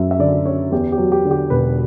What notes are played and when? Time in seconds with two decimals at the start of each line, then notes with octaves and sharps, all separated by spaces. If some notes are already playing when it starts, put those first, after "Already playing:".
Already playing: F#2 F#3 E5
0.11 E5
0.19 D3 D5
0.46 C#4 C#5
0.72 E2 G4
0.92 G4
0.98 F#3
1.12 G4
1.25 D3
1.31 G4
1.50 E1 B4